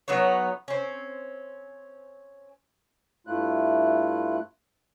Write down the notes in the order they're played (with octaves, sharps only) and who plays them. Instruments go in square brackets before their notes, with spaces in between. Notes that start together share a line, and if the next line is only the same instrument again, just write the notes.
[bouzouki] F#3 B3 D#4 C#5
C4 C#4
[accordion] G2 A3 E4 F4 F#6